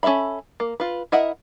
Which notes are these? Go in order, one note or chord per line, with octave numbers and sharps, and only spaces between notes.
C#4 A4 A#4 E5 B5
A#3
F4 B4
E4 A#4 D#5 E5 F#5